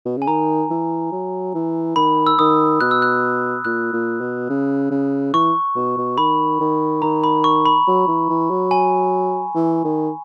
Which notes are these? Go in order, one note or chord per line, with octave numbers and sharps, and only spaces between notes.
B2
C#3 G#5
D#3 A#5
E3
F#3
E3
D#3 B5
E6
D#3 D#6
B2 F#6
E6
F#6
A#2 F#6
A#2
B2
C#3
C#3
E3 C#6
B2
B2
D#3 B5
D#3
D#3 A#5
B5
C#6
B5
F#3
E3
E3
F#3
G#5
E3
D#3